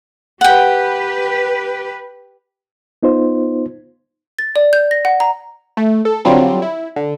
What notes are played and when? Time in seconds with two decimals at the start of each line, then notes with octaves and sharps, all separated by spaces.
0.41 G4 B4 F#5 G5
3.03 B3 D#4 F4 C5
4.39 A6
4.56 D5
4.73 G6
4.91 A#6
5.05 F#5
5.20 A#5
5.77 A3
6.05 A4
6.25 D3 F#3 G3 C4 F4
6.62 E4
6.96 D3